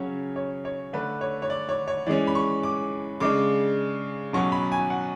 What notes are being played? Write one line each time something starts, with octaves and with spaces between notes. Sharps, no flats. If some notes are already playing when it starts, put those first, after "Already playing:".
Already playing: C#3 F#3 C#4 C#5
C#5
C#5
D3 A3 D4 B4
C#5
C#5
D5
C#5
C#5
E3 G#3 C#4 D5
B5
C#6
D6
C#3 G#3 D4 D6
B2 F#3 C#4 C#6
B5
G#5
F#5